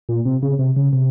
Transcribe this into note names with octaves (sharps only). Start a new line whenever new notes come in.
A#2
C3
C#3
C3
C#3
C3